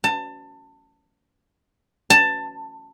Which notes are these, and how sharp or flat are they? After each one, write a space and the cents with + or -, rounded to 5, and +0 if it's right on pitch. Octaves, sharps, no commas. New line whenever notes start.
A5 +25
A5 +15